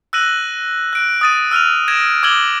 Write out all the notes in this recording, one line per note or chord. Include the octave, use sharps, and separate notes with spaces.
E6 F#6 A#6 D#7 F#7
F#6 D7
D#6 A6 D#7
E6 F6 D#7 F7
G#6 A#6 D7 E7
D6 E6 G#6 F#7 G7